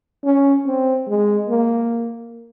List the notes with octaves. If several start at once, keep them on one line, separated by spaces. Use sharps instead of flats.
C#4
C4
G#3
A#3